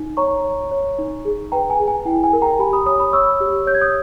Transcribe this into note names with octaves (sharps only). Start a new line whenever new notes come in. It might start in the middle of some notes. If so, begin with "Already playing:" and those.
Already playing: D#4
C#5 A#5 C#6
C#5
C#5
D#4
G#4
B4 G5 A#5
G#5
G#4
G#5
E4 G5
G#5
A#4
G5 A#5
G4 G#5 B5
B5 D#6
C#5 B5 D#6
B5 D#6
C#5 C#6 E6
G4
C#5 G6
G#6
D#6 G6